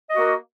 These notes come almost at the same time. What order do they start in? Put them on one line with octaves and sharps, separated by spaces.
D#5 F#4 A#3